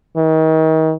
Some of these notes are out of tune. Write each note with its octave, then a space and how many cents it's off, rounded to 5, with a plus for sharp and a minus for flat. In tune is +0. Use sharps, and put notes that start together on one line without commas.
D#3 +35